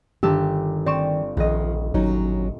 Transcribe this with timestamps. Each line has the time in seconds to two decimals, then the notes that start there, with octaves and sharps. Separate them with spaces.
0.23 G1 D#3 G4 A5 E6
0.86 C4 D5 C#6 E7
1.37 D#1 A#1 F3 D#5
1.94 G#1 F#3 C#4 D#4